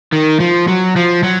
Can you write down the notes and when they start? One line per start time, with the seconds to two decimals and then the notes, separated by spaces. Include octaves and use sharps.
0.13 D#3
0.40 F3
0.68 F#3
0.96 F3
1.23 F#3